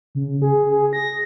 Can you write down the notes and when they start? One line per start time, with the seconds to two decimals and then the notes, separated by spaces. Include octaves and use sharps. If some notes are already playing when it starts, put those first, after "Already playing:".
0.15 C#3
0.42 G#4
0.71 G#4
0.93 A#6